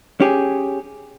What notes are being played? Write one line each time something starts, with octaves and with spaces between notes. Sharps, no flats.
C#4 G4 G#4